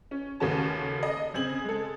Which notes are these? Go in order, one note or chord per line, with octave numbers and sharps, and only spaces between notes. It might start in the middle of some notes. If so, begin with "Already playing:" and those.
C#4
D#2 C#3 A3 C#4 F#4 A5
A4 D#5
C#3 C4 G#4 G#6 F#7
G#3 A4